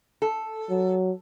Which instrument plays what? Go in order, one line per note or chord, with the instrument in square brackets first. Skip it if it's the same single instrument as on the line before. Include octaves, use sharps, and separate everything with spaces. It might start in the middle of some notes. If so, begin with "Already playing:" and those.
[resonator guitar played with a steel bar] A4
[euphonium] F#3